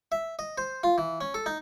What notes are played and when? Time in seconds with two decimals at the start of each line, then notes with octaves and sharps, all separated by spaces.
0.12 E5
0.39 D#5
0.58 C5
0.83 F4
0.98 E3
1.21 C#4
1.34 A4
1.46 D#4